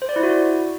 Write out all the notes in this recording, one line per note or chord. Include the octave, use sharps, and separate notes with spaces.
C5
D5
E4
F#4